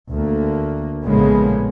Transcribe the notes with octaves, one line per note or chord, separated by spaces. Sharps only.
D2 A#3
A#1 A2 C#3 G#3 A#3 B3